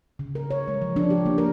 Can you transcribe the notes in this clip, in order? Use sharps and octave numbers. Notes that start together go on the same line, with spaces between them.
C#3
A#4
C#5
G#3
F3
D4
G4
A#3
A#4